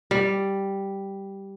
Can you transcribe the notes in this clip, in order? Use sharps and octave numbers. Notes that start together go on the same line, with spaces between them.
G3